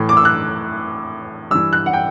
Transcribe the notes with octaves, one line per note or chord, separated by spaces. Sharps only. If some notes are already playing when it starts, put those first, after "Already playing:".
Already playing: A2 E3
D6
E6
F#6
G2 E3 E6
F#6
F#5
G5